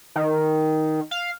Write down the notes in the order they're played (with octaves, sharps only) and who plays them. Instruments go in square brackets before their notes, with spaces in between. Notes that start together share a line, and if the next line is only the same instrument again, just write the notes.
[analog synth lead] D#3
F5